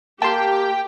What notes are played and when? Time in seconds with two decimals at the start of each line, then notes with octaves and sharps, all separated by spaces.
0.22 A#3 G4 G5 A5 C6